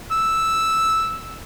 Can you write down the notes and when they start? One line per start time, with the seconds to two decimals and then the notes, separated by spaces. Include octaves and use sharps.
0.12 E6